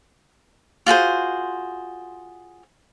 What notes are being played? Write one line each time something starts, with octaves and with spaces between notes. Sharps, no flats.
F4 F#4 G#4 C5